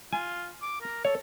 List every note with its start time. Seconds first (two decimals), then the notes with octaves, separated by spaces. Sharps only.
0.13 F4 G#5
0.62 D6
0.81 A#4
1.05 A4 C#5